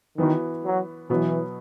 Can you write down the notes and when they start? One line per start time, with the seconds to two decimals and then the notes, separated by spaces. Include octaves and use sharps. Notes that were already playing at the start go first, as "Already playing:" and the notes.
0.18 D#3 E3 B3 F#4
0.64 F#3
1.10 B2 E3 F#3 B3 F#4